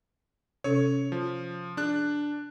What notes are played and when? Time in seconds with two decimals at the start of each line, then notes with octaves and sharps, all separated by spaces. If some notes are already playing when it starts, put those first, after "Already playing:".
0.64 C3 C#4 A4 C#5
1.12 F3
1.77 D4 G#4 F#6